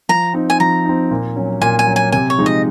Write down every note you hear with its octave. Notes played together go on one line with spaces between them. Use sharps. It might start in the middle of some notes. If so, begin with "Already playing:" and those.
F3 A#5
C4 D#4
G#5
F3 A#5
C4 D#4
A#2
F#3 C#4
A#2 G#5
G#5
F#3 C#4
G#5
C3 G#5
C#5
F3 G#3 D#4
D#5